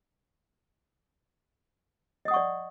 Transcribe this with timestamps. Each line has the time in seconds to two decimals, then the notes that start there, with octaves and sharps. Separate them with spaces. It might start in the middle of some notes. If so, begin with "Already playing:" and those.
2.25 D#5
2.28 D#6
2.31 F#5
2.34 C#6
2.36 D5